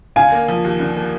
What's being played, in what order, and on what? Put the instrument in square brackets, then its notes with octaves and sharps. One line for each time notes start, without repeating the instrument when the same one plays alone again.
[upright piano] D3 [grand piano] F5 G#5
[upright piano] A#3
F3
D#2
D3
A#3